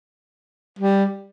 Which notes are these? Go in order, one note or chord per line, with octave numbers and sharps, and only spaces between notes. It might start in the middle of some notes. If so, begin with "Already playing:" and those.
G3